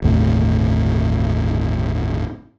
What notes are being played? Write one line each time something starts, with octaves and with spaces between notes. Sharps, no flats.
G1 D#2 A2 C3